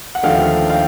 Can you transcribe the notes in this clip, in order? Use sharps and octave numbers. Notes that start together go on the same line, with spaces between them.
F#5
D#2 D3 F3 A3 F5 G5
F5 G5